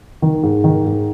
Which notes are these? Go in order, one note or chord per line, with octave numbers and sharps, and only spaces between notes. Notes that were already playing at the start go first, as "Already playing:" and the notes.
D#3
G#2
D#3
G#2